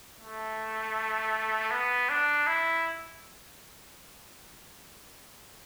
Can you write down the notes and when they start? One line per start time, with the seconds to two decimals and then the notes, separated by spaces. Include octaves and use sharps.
0.19 A3
1.71 B3
2.09 D4
2.47 E4